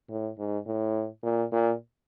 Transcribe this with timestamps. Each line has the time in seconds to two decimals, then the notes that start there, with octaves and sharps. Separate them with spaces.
0.09 A2
0.38 G#2
0.66 A2
1.23 A#2
1.52 A#2